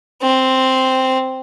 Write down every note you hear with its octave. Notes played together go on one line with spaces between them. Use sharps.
C4